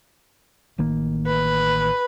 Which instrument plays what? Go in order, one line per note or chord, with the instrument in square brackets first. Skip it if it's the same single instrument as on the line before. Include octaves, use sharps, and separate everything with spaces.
[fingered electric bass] A1 D#3 A#3
[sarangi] B4